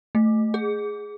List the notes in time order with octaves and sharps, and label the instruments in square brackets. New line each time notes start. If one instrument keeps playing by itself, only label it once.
[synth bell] A3
G#4